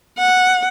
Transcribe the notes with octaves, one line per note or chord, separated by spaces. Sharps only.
F#5